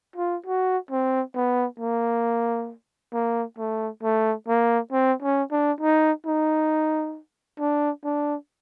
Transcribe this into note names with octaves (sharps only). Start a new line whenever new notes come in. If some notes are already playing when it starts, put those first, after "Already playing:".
F4
F#4
C4
B3
A#3
A#3
A3
A3
A#3
C4
C#4
D4
D#4
D#4
D4
D4